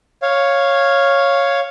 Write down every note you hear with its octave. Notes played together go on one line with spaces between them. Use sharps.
C#5 F5